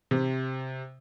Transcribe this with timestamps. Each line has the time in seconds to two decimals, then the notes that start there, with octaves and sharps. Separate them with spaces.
0.11 C3